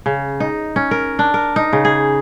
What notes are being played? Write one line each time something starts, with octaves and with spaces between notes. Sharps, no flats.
C#3
D#4
C#4
A#4
D4
A#4
D#4
C#3
G#4